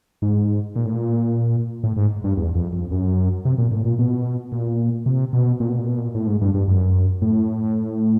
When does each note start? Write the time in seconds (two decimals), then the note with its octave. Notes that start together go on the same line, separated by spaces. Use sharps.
0.22 G#2
0.76 A#2
0.85 A2
0.94 A#2
1.84 A2
1.97 G#2
2.24 G2
2.37 E2
2.55 F2
2.73 F2
2.91 F#2
3.45 C3
3.58 A#2
3.72 A2
3.85 A#2
3.99 B2
4.52 A#2
5.06 C3
5.33 B2
5.60 A#2
5.69 B2
5.78 A#2
5.88 B2
5.97 A#2
6.15 A2
6.27 G#2
6.41 G2
6.54 G2
6.68 F#2
7.22 A2